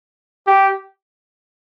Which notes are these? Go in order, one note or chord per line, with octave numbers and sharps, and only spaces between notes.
G4